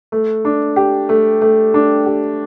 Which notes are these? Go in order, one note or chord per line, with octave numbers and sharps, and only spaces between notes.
A3
D4
G4
A3
A3
D4
G4